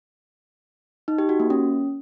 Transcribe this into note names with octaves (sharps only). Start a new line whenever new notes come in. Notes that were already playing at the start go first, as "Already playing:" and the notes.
D#4
G4
F#4
A#3
C#4